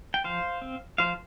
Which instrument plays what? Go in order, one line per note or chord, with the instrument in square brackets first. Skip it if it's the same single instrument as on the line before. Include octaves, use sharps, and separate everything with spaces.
[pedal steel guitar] G5
F3 C5 F5
C4
F3 C5 F5